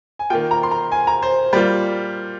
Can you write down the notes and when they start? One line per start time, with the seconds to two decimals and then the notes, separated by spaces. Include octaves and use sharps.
0.19 G#5
0.30 D#3 A#3 F4 G5
0.51 A#5
0.63 C6
0.71 A#5
0.92 G#5
1.07 A#5
1.23 C5
1.53 G3 A#3 F4